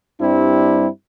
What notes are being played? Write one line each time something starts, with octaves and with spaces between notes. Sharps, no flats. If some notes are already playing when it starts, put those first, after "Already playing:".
G2 G3 C4 D4 E4